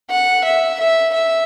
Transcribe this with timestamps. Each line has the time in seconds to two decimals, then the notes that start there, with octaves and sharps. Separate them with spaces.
0.10 F#5
0.44 E5
0.80 E5
1.13 E5